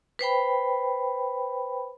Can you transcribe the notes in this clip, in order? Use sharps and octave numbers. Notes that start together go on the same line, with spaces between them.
B4 C5 G5 B5